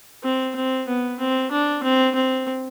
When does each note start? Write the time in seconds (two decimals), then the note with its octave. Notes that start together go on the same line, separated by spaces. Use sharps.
0.24 C4
0.56 C4
0.88 B3
1.19 C4
1.52 D4
1.83 C4
2.15 C4